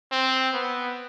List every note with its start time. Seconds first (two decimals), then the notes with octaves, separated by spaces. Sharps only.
0.12 C4
0.54 B3